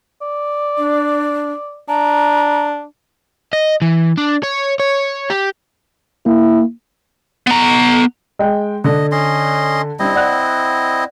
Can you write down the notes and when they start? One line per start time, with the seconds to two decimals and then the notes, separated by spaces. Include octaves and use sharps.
0.22 D5
0.78 D4
1.89 D4 A#5
3.53 D#5
3.82 E3
4.17 D4
4.43 C#5
4.80 C#5
5.30 G4
6.26 A#3 E4
7.47 B3 A#5
8.39 G#3 G5
8.84 D3 D#5
9.12 C#4 D#5 C6
9.99 G3 C4 D4 E4 D#5
10.14 D5 F#5 F#6